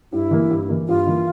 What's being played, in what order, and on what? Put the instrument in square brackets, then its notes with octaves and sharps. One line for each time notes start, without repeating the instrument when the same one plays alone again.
[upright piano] G2 [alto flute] E4
[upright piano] E3 A#3
G2
E3 A#3
[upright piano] G2 [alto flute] F4
[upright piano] E3 A#3